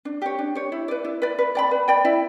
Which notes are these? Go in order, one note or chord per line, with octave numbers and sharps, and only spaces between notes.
D4
G4 C#5
D4
G4 C#5
E4
B4 D5
E4
B4 D5
B4
D5 G5 B5
B4
D5 G5 B5
E4